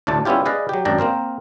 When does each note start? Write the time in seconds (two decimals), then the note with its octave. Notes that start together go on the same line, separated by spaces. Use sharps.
0.07 D2 A2 A3 D5 A5
0.25 G3 B3 C#4 E4 F4 G4
0.45 G#4 B4 D5 D#5 F5
0.69 F#3 G4
0.85 G#1 F#2 D4 D5 G5 A#5
0.99 A#3 C4 A#4 C5